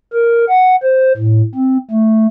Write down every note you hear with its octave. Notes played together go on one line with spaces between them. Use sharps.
A#4
F#5
C5
A2
C4
A3